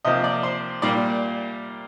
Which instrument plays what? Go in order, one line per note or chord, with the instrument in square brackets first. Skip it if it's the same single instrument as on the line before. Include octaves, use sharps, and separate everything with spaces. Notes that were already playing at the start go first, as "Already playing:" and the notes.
[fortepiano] C3 F3 A#3 D#5
D5
C5
A#2 G3 A#3 D5